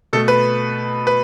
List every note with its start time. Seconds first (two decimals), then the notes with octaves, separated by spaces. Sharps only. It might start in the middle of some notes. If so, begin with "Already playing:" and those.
0.13 B2 A3 A4
0.28 B4
1.07 B4